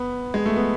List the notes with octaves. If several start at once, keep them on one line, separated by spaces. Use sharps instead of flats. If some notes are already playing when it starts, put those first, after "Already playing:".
Already playing: B3
G#3
A3
B3